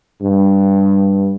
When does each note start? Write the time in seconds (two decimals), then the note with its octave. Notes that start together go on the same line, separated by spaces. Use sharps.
0.22 G2